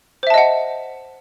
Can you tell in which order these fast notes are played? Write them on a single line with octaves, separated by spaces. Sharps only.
C5 E5 A5 D#5 F#5